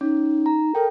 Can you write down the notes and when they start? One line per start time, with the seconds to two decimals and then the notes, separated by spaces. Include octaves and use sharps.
0.01 C#4 D#4
0.46 A#5
0.75 A4 A#4 G5